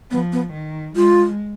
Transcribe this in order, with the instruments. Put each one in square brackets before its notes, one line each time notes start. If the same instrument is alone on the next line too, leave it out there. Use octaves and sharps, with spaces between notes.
[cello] F3 [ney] B3
[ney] B3
[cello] D#3
[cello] G#3 [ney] F4